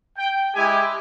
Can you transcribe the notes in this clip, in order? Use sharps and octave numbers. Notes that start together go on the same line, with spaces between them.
G5
G#3 E4 G4 G#5